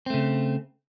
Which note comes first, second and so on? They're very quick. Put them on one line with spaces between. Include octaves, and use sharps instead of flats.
C4 A3 C#3